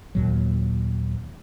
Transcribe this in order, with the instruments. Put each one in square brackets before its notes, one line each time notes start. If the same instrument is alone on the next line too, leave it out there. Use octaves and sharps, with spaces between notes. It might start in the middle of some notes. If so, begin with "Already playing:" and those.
[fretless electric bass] D#2 A#2 F#3